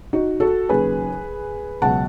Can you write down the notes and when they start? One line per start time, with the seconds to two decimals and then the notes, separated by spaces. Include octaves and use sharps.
0.13 D#4 F#4
0.40 F#4 A4
0.69 D#2 C#3 F#3 G#4 B4
1.82 C#2 B2 F#3 F#5 A5